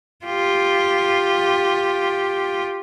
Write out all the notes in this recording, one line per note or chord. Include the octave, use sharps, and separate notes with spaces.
F4 G4